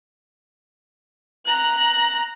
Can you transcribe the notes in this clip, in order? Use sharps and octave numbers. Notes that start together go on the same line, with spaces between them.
A#5 F#6